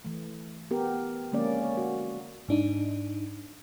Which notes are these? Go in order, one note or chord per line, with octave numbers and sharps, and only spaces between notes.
E3 A3
B3 G4 A#4
D3 F3 G#3 A#3 C#4 D5
C#5
F#4
G#2 D4 D#4